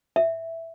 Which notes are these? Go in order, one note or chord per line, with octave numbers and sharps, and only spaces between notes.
E5